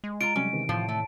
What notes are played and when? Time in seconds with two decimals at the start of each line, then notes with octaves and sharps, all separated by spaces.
0.04 G#3
0.21 F4 A#5 D7
0.36 C3 F#3 G3 C#4
0.53 C3 D#3 E3
0.69 A2 F3
0.89 A3